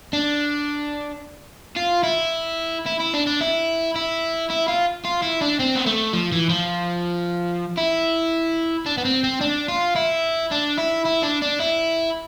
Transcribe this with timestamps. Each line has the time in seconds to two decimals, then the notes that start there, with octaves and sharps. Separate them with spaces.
0.13 D4
1.77 F4
2.03 E4
2.86 E4
3.00 E4
3.14 D4
3.27 D4
3.41 E4
3.95 E4
4.50 E4
4.68 F4
5.05 F4
5.22 E4
5.41 D4
5.59 C4
5.75 B3
5.86 A3
6.13 F3
6.32 E3
6.49 F3
7.78 E4
8.86 D4
8.98 B3
9.05 C4
9.24 C4
9.41 D4
9.68 F4
9.96 E4
10.51 D4
10.78 E4
11.05 E4
11.23 D4
11.42 D4
11.59 E4